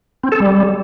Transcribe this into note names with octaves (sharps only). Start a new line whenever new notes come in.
C4
A4
G3